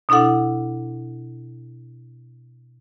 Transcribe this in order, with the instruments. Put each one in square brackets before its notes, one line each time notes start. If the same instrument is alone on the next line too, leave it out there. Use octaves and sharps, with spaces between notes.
[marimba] B2 D4 E4 A4 F#5